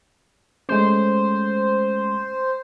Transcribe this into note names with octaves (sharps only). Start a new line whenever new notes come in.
G#3 A3 C#4 C5